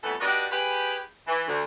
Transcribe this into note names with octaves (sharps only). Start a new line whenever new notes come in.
F2 E3 G3 A3 B3 A4
D4 F#4 G4 B4 D5 D#5
G4 G#4 B4
E3
D2